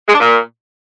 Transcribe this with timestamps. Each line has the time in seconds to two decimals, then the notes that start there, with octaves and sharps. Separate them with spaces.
0.07 G#3
0.14 D4
0.20 A#2